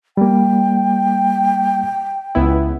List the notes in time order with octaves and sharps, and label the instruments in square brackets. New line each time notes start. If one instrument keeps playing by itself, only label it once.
[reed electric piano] G3 A#3 [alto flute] G5
[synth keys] C#2 B3 E4